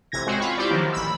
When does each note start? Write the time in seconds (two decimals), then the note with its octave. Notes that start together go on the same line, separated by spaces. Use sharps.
0.12 A1 C3 G#6 A#6
0.26 G#3 C4 C#4 F#4
0.39 F4 B5 C#6
0.57 E4 F4 G4 C5 D5
0.70 D#3 F3 F#3 A#3
0.93 A1 B5 E6